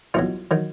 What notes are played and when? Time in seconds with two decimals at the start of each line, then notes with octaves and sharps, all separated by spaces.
0.14 C2 B2 F#3 D#4 F4
0.51 D#3 F#3